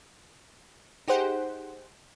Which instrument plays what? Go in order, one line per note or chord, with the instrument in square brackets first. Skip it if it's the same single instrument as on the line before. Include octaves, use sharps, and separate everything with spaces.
[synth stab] D#4 G4 G#4 C5 F#5 G5